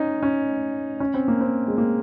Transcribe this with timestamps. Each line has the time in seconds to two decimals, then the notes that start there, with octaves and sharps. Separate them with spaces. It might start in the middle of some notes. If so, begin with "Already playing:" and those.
Already playing: C#4 D#4
0.23 C#4
1.00 C#4
1.14 C4
1.28 A#3
1.41 C4
1.68 G#3
1.78 A#3